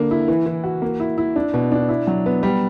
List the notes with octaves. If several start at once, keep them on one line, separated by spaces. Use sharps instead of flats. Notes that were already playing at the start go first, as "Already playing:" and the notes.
Already playing: D3 A#3
E4
E3
E3
F#4
A#3
E4
E4
D4
B2
D4
E4
F#3
B3
G3